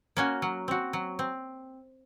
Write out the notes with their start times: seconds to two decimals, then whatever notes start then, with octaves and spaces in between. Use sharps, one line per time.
0.17 A#3 C#4 F#4
0.42 F#3
0.68 C4 F#4
0.93 F#3
1.19 C4